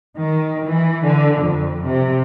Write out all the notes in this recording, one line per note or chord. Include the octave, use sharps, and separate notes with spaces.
D#3
E3
D3
F2
C3